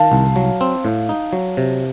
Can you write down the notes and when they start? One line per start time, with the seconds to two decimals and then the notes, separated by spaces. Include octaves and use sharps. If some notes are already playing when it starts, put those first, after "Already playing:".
Already playing: D#3 F5 A5
0.12 C2
0.36 F#3
0.61 C4
0.85 A2
1.09 D#4
1.33 F#3
1.57 C3